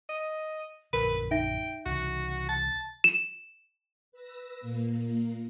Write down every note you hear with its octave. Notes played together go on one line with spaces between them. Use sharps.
D#5
A#1 F#2 D3 A#4 B4
D#4 E5 G5 A#6
C2 C#3 E3 F#4
A5
E7
B4 E6 A#6
A#2 A#3